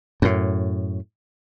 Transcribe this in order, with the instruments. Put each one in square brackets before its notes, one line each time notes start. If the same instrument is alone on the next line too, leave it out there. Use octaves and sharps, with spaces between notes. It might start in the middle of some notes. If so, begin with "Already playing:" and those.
[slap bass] F#2 A2